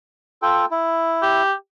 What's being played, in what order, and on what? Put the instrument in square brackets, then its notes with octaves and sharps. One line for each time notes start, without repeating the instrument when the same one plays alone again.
[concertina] F4 A4 G5
E4
[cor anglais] G4